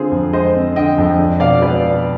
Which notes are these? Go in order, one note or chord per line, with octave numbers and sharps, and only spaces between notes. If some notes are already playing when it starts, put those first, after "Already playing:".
Already playing: D3 C4 F4 G#4 C5
F2
G#3 C5 D#5
C4
D3 D#5 G5
F2
D4
B2 D5 F5
G#3 B4 D5
B2